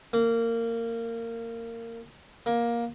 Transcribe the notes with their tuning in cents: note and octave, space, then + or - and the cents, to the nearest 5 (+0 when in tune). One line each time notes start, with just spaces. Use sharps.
A#3 -20
A#3 +15